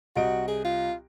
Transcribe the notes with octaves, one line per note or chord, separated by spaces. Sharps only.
C2 F#4 D#5 D7
G#4
F4